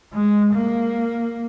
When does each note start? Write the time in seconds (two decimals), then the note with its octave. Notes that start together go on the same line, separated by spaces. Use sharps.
0.13 G#3
0.53 A#3